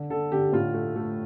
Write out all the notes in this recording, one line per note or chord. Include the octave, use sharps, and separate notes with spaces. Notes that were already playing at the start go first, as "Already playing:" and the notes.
Already playing: D3
D3 A4
D3 G4
A2 F4
A3
A3